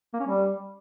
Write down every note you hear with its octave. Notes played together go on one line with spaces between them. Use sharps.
A#3
C#4
G3